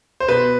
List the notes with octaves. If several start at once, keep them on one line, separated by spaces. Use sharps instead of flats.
C5
B2 B4